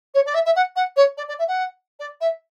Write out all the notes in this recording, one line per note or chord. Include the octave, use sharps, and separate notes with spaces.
C#5
D5
E5
E5
F#5
F#5
C#5
D5
D5
E5
F#5
D5
E5